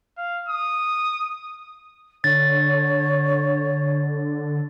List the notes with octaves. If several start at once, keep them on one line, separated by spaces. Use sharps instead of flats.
F5
D#6
D3 C#5 A6